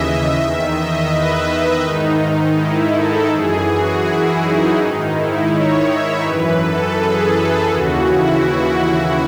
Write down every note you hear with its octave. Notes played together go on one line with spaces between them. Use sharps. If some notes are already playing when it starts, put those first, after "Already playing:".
Already playing: D#2 C#3 E3 D#5 E5
E2 D#3
D#5
B4
G#2 D#3 D#4
E4
A4
F#2 E3 G#4
F#4
E4
D#4
G#2 D#3
E4
C#5
E5
F#2 E3 B4
A4
G#4
A4
D#2 C#3 E3 F#4
E4
F#4